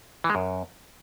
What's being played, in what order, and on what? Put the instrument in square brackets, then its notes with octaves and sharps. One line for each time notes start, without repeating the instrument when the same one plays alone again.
[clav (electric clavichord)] E3
G#3
F#2